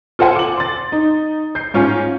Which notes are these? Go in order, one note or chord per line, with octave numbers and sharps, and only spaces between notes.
F4 A4 C5 F#5 G#5
D6 F#7
C6 A6
D#4
G6 C7
G#2 C#4 F4 F5 G#5